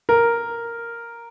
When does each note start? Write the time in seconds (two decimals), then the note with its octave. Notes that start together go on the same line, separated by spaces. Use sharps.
0.09 A#4